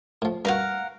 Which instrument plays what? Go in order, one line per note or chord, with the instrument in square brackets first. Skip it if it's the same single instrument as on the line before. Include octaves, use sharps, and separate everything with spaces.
[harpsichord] A2 F3
[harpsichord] G2 F#4 [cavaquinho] A#4 F5 F#5